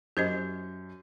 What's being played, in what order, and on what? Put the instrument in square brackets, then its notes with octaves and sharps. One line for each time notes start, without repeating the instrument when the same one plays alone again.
[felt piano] F#2 [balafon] G4 C5 D#5 [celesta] G6